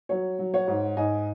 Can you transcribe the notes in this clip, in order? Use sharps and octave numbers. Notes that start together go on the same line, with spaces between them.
F#3 C#5
F#3
C#5 F#5
G#2
G#2 D#5 G#5